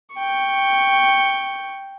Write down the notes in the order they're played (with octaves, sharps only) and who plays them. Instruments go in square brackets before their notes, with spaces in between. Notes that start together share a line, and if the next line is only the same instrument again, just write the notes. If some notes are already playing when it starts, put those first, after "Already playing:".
[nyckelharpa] G5 C#6